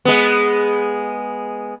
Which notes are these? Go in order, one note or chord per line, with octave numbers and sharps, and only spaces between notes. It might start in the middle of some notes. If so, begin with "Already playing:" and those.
G#3 B3